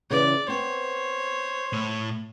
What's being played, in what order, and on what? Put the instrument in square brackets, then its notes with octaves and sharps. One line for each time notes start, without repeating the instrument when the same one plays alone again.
[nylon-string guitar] C#3 E3 [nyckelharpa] D5
[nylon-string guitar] B3 C4 [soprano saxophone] C5 [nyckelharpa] C#5
[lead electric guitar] A2